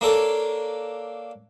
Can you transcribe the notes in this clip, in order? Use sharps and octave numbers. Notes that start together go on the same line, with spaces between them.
A#3 D4 A4 C#5